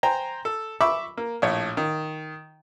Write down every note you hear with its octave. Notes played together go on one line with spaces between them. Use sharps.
C5 G5 G#5 A#5
A4
E5 B5 C#6 D6 E6
A#3
A#1 A2 C#5
D#3